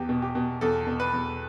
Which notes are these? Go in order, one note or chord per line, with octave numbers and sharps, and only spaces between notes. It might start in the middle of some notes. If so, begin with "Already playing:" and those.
Already playing: E2 G4
B2
G4
B2
E2 A4
B2
B4
E2